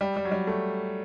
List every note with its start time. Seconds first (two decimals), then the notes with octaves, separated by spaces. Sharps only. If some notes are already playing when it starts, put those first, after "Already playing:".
0.01 G3
0.16 G3
0.25 F#3
0.32 G3
0.47 A3